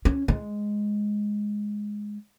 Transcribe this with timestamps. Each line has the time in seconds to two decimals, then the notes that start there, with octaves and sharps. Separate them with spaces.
0.05 C#4
0.28 G#3